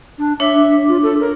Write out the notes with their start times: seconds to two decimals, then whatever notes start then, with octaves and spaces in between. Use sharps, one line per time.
0.18 D4
0.40 D4 C#5 E5 D6
0.88 F4
1.03 A4
1.20 A#4